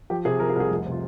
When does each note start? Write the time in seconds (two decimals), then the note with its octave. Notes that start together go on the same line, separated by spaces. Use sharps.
0.10 F3 G4
0.25 C3 G#4
0.40 F3 A#4
0.50 G#4
0.56 C2 A#4
0.60 G#4
0.71 F1
0.86 C3
0.92 F4